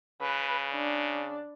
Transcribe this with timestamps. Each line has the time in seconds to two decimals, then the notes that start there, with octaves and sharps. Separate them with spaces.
0.22 C#3 B4
0.72 D4